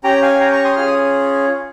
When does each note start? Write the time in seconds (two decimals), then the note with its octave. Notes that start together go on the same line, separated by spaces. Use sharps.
0.04 C#4 G4 G5 A#5
0.22 F5 G#5
0.40 G5 A#5
0.52 A#5 C#6
0.65 C6 D#6
0.76 C#4 F4 G#4 F6
0.87 D#6